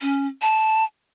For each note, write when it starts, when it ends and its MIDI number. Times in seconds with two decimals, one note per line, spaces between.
0.01 0.27 61
0.42 0.84 81